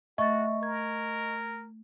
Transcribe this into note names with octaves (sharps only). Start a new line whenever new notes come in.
A3 F#4 D#5 E5 C#6 A6
A#4 G#6